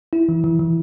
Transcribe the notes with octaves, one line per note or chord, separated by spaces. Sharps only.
E4
E3
E3
E3